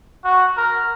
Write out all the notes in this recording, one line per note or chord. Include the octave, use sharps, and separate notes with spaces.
F#4
A#4